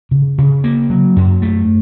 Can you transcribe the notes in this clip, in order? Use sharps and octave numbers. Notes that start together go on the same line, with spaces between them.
C#3
C#3
A#3
F#3
F#2
A3